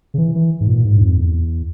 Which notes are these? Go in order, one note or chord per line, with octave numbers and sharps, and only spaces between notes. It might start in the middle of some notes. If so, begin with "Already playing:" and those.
C#3
E3
E3
G#2
A#2
G#2
G2
F2
E2